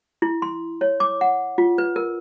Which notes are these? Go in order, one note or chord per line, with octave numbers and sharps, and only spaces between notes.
E4
C6
C#5
D6
F#5
F4
B4
A#4